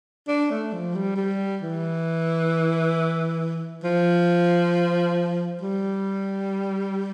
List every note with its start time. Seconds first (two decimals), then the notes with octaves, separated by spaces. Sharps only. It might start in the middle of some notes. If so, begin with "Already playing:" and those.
0.28 D4
0.51 A3
0.73 F3
0.94 G3
1.16 G3
1.61 E3
3.83 F3
5.61 G3